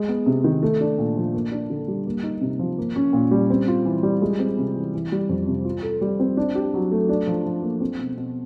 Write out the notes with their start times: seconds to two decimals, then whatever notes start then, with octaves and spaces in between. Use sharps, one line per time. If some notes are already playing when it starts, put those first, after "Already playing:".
Already playing: G#3
0.09 B3
0.26 C3
0.44 D#3
0.63 A3
0.81 D4
0.98 A#2
1.17 F3
1.33 A#3
1.51 D4
1.70 D3
1.88 G3
2.06 A#3
2.23 D#4
2.41 C3
2.59 F3
2.78 A#3
2.96 C#4
3.13 A#2
3.31 G3
3.50 C4
3.68 F4
3.85 E3
4.03 G3
4.22 G#3
4.39 C4
4.58 C3
4.75 E3
4.94 E3
5.12 G3
5.29 F2
5.47 C3
5.65 F4
5.83 A4
6.01 G3
6.20 C4
6.37 D4
6.55 G4
6.74 F#3
6.92 A3
7.09 D4
7.27 F3
7.46 F3
7.62 A#3
7.81 C4
7.98 B2
8.17 B2